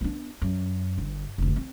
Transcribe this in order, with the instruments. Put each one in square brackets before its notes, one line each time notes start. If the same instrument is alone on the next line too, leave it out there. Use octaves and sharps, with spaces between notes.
[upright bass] B3 D4
F#2
G1
F1 D2
C4